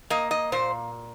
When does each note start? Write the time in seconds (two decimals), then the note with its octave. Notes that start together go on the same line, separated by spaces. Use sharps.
0.10 A#3 D#5
0.31 D#5
0.52 A#2 C5